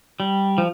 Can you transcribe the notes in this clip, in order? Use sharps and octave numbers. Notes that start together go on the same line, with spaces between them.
G3
F3